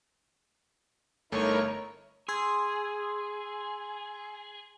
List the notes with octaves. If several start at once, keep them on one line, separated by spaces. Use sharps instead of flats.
G1 A3 D#4 E4 A#4 C#5
G#4 C6 E6 G#6